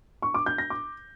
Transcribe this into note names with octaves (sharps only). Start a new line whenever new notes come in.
C#6
D6
G6
A#6
D6